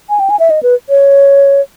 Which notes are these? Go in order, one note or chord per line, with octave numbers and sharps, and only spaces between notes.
G#5
G5
G#5
E5
D#5
B4
C#5